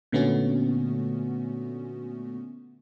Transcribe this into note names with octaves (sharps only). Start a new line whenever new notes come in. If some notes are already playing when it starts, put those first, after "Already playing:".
A#2 D3 A3 B3 C#4 F#4